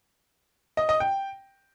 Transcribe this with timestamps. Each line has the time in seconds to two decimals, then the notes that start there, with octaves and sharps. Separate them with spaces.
0.77 D#5
0.89 D#5
1.00 G5